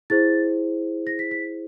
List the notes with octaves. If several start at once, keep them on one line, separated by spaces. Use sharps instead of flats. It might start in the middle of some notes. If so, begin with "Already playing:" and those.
E4 G#4 C5 A6
A#6
B6
B6